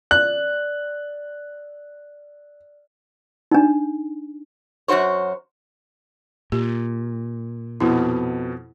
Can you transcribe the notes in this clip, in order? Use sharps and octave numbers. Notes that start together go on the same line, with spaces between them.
D5 F#6
D4 D#4
F#2 B2 F#4 C5 C#5
A#2 G4
F2 B2 B3 E4